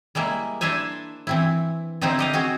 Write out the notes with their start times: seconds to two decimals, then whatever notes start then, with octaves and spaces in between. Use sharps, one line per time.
0.15 G3 G#3 A#3 E4
0.61 D4 E4 C5 E5 G#5
1.27 E3 C4 E4
2.01 D3 F3 C4 D#4 E4 C5
2.19 G4 D#5 F5
2.33 C4 F#4 G#4